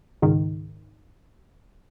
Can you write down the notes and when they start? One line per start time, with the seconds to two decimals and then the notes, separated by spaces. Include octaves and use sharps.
0.22 C#2 G#2 D#3